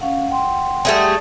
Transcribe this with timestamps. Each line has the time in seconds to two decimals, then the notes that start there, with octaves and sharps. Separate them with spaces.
0.01 C#4 F5 F#5
0.28 F#5 G5 C6
0.85 G3 A3 G#4